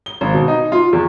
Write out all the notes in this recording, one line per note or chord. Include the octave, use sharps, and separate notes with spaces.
G7
G#1
B2
D#4
F4
E2